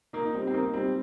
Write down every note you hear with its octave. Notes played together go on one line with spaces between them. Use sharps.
A#3 D#4
D#4
G3 C4
C4
A#3 D#4
G3 C4
G3